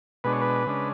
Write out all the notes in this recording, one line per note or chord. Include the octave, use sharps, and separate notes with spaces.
B2 G#3 D4 B4
C#5
B4
C#3 G#3 D4